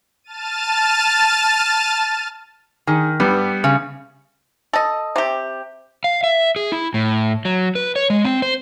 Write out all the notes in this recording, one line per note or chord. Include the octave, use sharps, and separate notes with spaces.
A5 F6 A6 D#7
D#3 G#4
G2 G3 B3
C#3
A4 D#5
C3 G4
F5
E5
G#4
E4
A2
F#3
B4
C#5
G#3
C4
C5